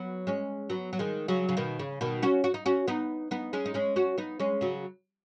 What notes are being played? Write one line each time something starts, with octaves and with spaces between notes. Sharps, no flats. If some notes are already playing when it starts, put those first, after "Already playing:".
Already playing: F#3 B3
G#3 C#4
F#3 B3
F#3
D#3 G#3
C#3 F#3
C#3
B2 D#3
C#3
B2 D#3
C#4 F#4
F#4
D#4
C#4 F#4
B3 D#4
B3 D#4
G#3 C#4
D#4
G#3 C#4
C#4 F#4
B3 D#4
G#3 C#4
C#3 F#3